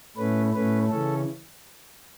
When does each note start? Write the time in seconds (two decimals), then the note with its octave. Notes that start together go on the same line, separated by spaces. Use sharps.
0.17 A2 A3 C#4 B4
0.53 A2 A3 C#4 B4
0.89 C#3 E3 C#4 A4